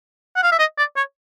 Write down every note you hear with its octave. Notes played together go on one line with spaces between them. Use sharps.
F#5
F5
E5
D#5
D5
C#5